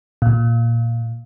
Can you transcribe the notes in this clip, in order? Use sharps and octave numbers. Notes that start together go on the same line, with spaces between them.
A#2